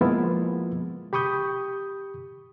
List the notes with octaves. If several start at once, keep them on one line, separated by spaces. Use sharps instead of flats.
F3 G#3 A#3 B3 E4 F4
G4 B5 C#6 D#6 G6